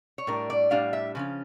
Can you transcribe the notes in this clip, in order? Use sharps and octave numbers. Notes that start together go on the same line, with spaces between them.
C#5
A2 G3 D4 A#4
D5
A2 G3 D4 F5
E5
C#3 F3 C#4